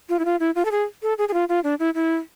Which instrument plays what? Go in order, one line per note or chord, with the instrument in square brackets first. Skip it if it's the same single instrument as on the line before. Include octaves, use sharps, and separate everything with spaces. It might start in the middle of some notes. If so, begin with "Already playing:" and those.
[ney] F4
E4
F4
E4
F4
A4
G#4
A4
G#4
G#4
F4
F4
D4
E4
E4